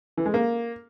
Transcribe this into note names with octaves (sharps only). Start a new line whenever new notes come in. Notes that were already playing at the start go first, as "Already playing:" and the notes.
E3
G#3
A#3